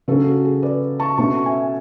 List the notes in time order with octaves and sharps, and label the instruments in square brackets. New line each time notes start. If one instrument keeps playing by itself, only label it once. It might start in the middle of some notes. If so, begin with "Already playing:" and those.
[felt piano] C#3 F#3 C#4 F#4 A4
F#4
G#4
B4 D5
A5 C#6
B2 A3 C#4 A5 C#6
E5 G#5